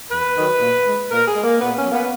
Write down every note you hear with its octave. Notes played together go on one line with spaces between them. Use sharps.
E2 B4
D#3 F#3
A#2
G#3
A#2 A#4
G#4
G#3
A#3
A#2 B3
C#4
F#3
A#3 B3